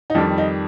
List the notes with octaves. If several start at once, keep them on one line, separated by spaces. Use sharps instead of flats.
D#4
F2 D#3 G3 D4
D#4